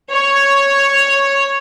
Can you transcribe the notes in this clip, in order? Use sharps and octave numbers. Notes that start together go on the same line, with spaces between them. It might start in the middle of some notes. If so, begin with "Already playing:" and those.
C#5